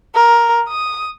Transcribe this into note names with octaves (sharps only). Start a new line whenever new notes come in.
A#4
D#6